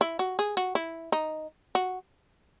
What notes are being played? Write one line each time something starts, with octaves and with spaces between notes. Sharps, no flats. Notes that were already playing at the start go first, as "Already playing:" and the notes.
E4
F#4
G#4
F#4
E4
D#4
F#4